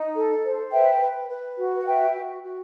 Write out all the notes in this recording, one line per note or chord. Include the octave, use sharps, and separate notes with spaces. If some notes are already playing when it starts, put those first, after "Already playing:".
Already playing: D#4
A4
C5
B4 E5 G5
B4
B4
F#4
F#5
B4 E5 G5
F#4
F#4